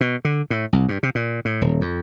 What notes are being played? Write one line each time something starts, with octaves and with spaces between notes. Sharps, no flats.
B2
D3
A2
C2
G2
C3
A#2
A2
D#1
F2